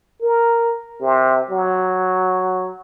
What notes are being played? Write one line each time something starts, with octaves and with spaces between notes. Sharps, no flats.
A#4
C3
F#3